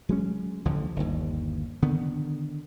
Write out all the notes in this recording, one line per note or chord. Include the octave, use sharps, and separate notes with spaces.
F#3 G#3 C#4
A1 D2 D3 F3
G1 D#2
D3 D#3 B3